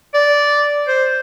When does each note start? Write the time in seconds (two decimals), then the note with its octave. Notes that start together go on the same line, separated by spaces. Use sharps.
0.14 D5
0.88 C5